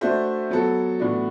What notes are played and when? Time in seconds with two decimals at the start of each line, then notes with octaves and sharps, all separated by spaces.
0.01 A3 D4 F#4 C5 E5
0.50 F#3 B3 F#4 A4
1.00 A2 E3 B3 D4 F#4